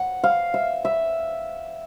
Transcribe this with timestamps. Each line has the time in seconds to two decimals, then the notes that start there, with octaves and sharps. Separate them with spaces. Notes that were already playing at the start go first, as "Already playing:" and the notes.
Already playing: F#5
0.24 F5
0.54 E5
0.85 E5